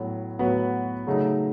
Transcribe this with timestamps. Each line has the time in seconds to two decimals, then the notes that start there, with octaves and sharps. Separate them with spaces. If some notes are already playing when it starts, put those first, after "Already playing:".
Already playing: A2 F#3 B3
0.39 A2 F#3 B3 F#4 B4
1.07 C#3 F#3 A3 D#4